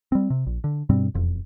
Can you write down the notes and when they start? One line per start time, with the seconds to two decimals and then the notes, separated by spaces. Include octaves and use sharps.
0.12 G3 C4
0.30 C3
0.46 A#1
0.64 D3
0.89 G2 B2 G3 C4
1.14 E1 F2